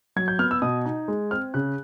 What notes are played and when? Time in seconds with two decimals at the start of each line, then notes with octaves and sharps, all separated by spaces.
0.16 F#3 G#6
0.28 G6
0.39 B3 F6
0.51 E6
0.62 B2 D#6
0.85 D#4
1.08 G#3
1.31 C4 F6
1.54 C#3 F#6